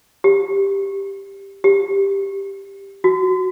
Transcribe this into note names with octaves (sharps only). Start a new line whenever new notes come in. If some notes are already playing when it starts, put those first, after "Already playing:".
G4
G4
F#4